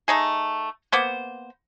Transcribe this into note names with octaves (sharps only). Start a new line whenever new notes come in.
A3 D#4 G#4
A#3 B3 C5